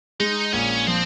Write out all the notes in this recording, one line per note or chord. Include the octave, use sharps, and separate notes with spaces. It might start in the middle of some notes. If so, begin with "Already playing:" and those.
G#3 D#4
A#1 C#4
F3 C4